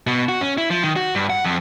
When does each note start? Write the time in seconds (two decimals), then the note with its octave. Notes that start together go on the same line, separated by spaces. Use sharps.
0.07 B2
0.29 F#4
0.41 C#4
0.58 E4
0.70 F3
0.83 D#3
0.96 F#4
1.15 G2
1.30 F#5
1.44 F2